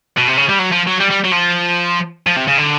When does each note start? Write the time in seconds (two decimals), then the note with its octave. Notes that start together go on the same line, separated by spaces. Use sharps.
0.17 B2
0.27 C3
0.37 C#3
0.49 G3
0.59 F#3
0.72 F3
0.87 F#3
1.00 G3
1.11 G3
1.25 F#3
1.32 F3
2.27 F3
2.36 C3
2.48 C#3
2.58 D3